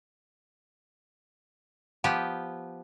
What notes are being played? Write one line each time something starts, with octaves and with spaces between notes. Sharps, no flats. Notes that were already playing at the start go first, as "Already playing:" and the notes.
F3 B3 G4